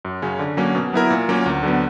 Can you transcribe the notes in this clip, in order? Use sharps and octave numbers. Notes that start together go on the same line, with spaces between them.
F#2
C#3 F#3 C#4
D3
F#3 A#3 C#4
B2
F#3 B3 E4 A#4
A#2
F#3 A#3 C#4
D2
D3 F#3 B3